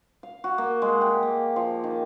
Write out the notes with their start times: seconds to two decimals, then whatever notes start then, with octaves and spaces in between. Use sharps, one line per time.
0.23 F5
0.44 F#4
0.58 A#3
0.82 G#3
1.01 G4
1.23 A#3
1.56 F3
1.84 D#3